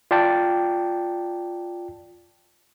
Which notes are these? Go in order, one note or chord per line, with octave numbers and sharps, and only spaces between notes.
F4 D5 G5 A5